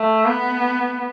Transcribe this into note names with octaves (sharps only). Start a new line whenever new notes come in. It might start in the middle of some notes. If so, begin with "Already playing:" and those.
Already playing: A3
B3